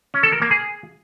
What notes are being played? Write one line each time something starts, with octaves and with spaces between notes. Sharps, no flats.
C#4
A4
A#4
A#3
G#4